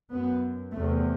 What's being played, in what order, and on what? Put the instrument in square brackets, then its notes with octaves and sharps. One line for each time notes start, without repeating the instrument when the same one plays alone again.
[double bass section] F#2 B3
E2 C3 A3